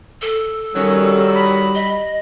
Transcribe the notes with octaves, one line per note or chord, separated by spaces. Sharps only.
A4
D#3 F#3 G3 C#4
B5
D#5